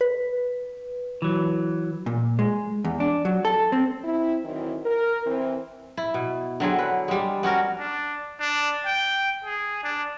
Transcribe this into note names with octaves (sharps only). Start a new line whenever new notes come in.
B4
E3 F#3
A#2
G#3
E2
D4
F#3
A4
C4
C4 E4
D#3 E3 F#3 C4 D#4 E4
A#4
E3 C4
E4
B2
D3 F#3 C4 G#4
B4
G3 G#3
B3 C#4 F#4 A#4
D4
D4
G5
G#4
D4